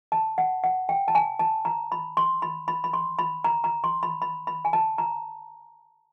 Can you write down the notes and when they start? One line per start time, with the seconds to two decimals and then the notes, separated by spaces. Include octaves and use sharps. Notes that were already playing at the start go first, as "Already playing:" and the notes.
0.12 A5
0.38 F#5
0.64 F#5
0.89 G5
1.08 A5
1.15 G#5
1.39 A5
1.65 A#5
1.92 B5
2.17 C6
2.42 B5
2.68 B5
2.84 B5
2.93 C6
3.19 B5
3.44 A#5
3.64 A#5
3.84 C6
4.03 B5
4.22 B5
4.47 B5
4.65 G#5
4.73 A5
4.98 A#5